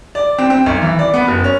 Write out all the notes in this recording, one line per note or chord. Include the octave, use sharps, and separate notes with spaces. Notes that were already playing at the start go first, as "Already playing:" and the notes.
D5
C4
C4
B1
E3
D5
B3
F#1
C#4